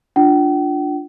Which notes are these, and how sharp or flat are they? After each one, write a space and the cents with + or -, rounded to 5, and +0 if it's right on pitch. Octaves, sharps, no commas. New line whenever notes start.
D4 +0 F4 +0 G5 -45